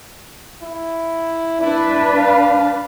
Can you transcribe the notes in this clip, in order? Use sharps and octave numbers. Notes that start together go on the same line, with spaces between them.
E4
D4 E4 B4
F5